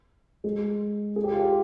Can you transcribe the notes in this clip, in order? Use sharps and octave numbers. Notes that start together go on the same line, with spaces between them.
G#3 G#4
G#4
G4
F4
G4